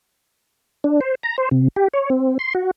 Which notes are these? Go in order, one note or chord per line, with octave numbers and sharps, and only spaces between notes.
D4
C5
A#5
C5
C3
G4
C#5
C4
C6
F#4